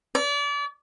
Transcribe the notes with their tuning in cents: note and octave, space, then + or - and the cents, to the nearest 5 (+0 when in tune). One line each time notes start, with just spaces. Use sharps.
D5 -35